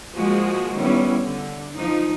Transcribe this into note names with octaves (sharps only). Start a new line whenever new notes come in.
F3 G#3 A#3 F#4 G#4 C5
D#3 G3 B3 C#4 E4
D3
F3 D#4